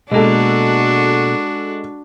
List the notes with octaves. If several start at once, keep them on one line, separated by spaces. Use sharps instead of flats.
B2 G#3 A#3 D4 F#4 A4